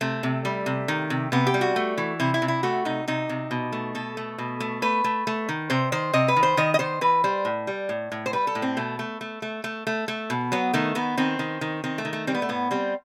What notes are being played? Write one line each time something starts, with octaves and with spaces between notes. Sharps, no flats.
C3 A3
C3
G3
C3
D#3
C3
C3 B3
G4
G3
F#4
A3
E3
C3 E4
E4
C3
E4
A3 F#4
C3 D#4
C3 D#4
C3
B2
A3
B2 A4
A3
B2
A3
A3 B4
A3
A3
D#3
C3 C5
D#3 C5
C3 D#5
B4
D#3
C5
D#3 D#5
D#5
D#3 C5
E3 B4
G3 C5
A2
G3
A2
A2
C5
G3 B4
A4
A2
C4
B2 A3
A3
A3
A3
A3
A3
A3
B2
F#3 B3
D#3 A3
D#3 B3
D#3 C4
D#3
D#3
D#3 C4
A3
D#3
A3
G3 C4
B3
A3
A2 B3
G3 C4